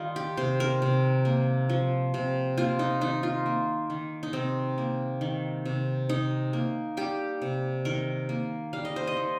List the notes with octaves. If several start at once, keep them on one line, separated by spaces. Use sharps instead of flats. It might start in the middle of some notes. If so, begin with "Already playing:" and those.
Already playing: D#3 G3 D#4 F4
G4
C3 C5
A#4
C3
A#3
F3
C3
A#3 F4
D#4
D#3 D#4
F4
A#3
D#3
D#4
C3 C4
A#3
D#3
C3
C3 D#4
A#3
G3 G4
C3
D#3 A#4
A#3
G3 F5
D#5
C5
D#5
D#3